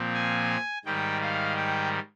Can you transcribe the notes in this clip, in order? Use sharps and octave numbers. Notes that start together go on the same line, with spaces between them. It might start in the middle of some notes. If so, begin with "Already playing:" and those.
Already playing: A#2 F3 C4
G#5
G#2 D#3 G3 G5
F5
G5